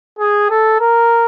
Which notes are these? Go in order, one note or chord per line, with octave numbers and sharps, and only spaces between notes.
G#4
A4
A#4